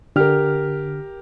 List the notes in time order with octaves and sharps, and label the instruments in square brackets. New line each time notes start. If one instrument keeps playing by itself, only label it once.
[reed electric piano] D3 F6 [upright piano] G4 A#4